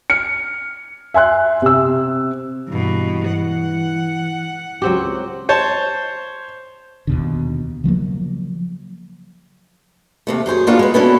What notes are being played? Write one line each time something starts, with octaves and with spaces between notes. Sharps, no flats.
F6 C#7
E5 G#5 C6 F#6
C3 E6
G2 B2 E3
F#5
C#2 F#3 C4 G4
C5 C#5 A5
D#2 B2 D3
C#3 F3 F#3 A#3
D#2 C3 A3
F#2 G#4 C5 C#5
A#3 B3 D4 F4 F#4 A4
G#3 B4
B2 B3 C#4 D4 E4 A4